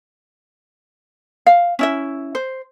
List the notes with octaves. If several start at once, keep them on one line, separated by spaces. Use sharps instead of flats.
F5
C#4 E4 E5
C5